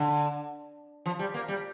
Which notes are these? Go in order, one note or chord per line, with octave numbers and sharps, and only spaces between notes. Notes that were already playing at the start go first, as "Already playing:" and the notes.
Already playing: D3
F3
G3
A#3
G3